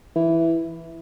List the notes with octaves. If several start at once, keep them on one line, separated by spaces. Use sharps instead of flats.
E3